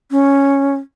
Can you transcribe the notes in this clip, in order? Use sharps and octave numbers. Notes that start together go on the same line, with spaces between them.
C#4